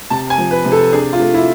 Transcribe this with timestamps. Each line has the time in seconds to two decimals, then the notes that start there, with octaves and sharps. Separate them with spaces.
0.10 C3 A5
0.30 G#5
0.38 F3
0.51 B4
0.65 C3
0.72 A4
0.92 D4 G#4
1.13 F4
1.19 A3
1.34 E4